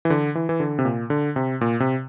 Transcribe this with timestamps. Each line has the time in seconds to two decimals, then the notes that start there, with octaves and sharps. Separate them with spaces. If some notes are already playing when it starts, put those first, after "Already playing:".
0.05 E3
0.10 D3
0.35 E3
0.49 E3
0.60 D3
0.79 C3
0.85 A#2
1.10 D3
1.36 C3
1.61 A#2
1.80 C3